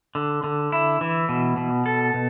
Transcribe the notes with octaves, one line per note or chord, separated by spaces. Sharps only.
D3
D3
E4
E3
B2
B2
A4
B2